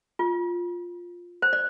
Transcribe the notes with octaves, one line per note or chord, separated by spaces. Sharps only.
F4
C5
D5